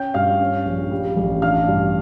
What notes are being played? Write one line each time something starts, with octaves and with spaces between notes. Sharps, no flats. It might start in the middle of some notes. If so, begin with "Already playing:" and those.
Already playing: C#4 G5 G6
G2 F5 F6
C#4
A#1
G3
A1
D4 F5 F6
G2